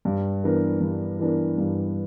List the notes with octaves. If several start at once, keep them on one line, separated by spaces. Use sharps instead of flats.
G2
E3 B3 D4 A#4
G2
E3 B3 D4 A#4
G2